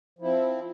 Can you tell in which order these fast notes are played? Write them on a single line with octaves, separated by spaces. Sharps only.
F3 E4 C4